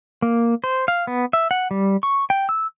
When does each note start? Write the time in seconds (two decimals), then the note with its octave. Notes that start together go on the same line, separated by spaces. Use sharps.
0.22 A#3
0.64 C5
0.88 F5
1.07 B3
1.33 E5
1.51 F#5
1.71 G3
2.03 C#6
2.30 G5
2.49 E6